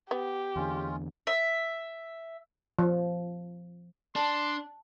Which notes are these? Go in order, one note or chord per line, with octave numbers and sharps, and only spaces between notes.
B3 G4
E2 D3 G#3 C#4 F4
E5
F3
D4 A5 C6